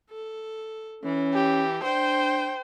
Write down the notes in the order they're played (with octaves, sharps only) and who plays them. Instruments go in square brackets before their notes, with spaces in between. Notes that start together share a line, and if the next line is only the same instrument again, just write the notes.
[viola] A4
[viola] E3 [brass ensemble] C#4
[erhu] G4
[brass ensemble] D4 [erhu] C5 [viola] G5